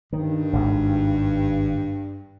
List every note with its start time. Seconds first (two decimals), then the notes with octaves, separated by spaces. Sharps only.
0.13 G2 D#3
0.53 G#1 G#2